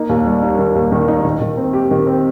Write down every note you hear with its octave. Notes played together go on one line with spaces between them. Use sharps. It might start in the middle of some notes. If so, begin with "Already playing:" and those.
Already playing: A#3 D#4
D#2
G3
D#4
D#3
D#2
D#3
D#4
D#3
D#3
C4
G4
D#3
C4